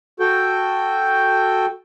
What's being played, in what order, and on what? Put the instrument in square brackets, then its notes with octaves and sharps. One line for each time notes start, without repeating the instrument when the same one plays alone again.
[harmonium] F#4 A4 G5